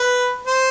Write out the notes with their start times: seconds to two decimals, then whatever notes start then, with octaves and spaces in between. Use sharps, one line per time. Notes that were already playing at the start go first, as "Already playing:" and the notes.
Already playing: B4
0.47 C5